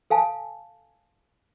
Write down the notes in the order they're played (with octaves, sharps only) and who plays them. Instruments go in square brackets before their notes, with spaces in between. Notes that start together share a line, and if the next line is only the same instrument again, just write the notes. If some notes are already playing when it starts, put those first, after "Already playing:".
[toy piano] A4 F5 G#5 A5